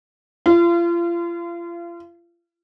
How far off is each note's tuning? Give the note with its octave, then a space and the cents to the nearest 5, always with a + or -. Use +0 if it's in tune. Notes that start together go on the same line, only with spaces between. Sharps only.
F4 -35